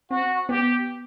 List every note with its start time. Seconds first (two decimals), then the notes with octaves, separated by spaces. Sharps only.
0.10 C4 F#4
0.49 B3 G4